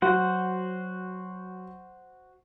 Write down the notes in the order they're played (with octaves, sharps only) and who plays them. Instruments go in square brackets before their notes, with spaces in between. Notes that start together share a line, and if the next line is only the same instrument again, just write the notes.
[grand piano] F#3 [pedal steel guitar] F#4 C5 F#5